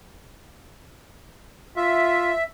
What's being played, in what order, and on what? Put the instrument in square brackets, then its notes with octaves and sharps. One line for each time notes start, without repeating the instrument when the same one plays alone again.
[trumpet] F4 [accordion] E5